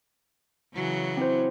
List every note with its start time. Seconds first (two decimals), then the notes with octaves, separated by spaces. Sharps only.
0.74 C#3 E3 F#3
1.17 C4 E4 C5